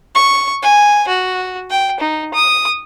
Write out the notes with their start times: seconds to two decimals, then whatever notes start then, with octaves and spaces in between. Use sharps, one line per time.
0.15 C#6
0.62 G#5
1.08 F#4
1.70 G5
2.00 D#4
2.34 D#6